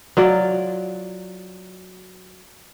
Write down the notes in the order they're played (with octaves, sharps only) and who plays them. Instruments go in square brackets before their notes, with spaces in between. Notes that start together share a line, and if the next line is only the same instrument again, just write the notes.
[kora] F#3 F4 D5